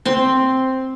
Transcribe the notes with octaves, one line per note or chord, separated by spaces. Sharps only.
C4 C6